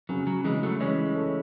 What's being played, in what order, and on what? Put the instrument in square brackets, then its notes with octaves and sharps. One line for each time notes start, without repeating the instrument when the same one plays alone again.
[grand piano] C#3 [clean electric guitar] F#3
[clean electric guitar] F#3
[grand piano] C#3 [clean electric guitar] E3 G#3
[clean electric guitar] F#3 A3
[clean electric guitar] E3 G#3 [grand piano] C#4
[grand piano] A3